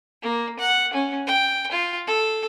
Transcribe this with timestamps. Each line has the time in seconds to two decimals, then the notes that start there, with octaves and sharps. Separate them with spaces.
0.22 A#3
0.59 F#5
0.93 C#4
1.26 G5
1.71 F4
2.07 A4